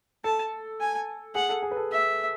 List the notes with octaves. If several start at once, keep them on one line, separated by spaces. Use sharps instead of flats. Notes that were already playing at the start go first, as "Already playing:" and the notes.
A4 A5
G#5
G#4 F#5
A4
G#4
B4
A4
E5